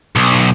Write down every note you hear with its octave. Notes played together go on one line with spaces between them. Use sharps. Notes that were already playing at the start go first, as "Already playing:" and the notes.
B1